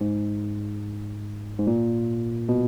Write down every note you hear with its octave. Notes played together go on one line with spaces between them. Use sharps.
G#2
G#2
A#2
B2